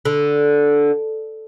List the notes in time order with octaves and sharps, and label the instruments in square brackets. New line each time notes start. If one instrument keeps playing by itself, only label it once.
[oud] D3